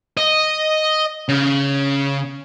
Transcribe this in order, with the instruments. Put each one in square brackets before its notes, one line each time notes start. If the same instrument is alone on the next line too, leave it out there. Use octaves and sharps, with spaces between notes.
[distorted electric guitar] D#5
C#3